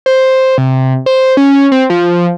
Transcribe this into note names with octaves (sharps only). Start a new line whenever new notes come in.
C5
C3
C5
C#4
C4
F3